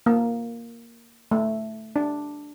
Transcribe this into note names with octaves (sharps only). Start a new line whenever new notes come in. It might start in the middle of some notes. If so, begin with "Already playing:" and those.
A#3
A3
D4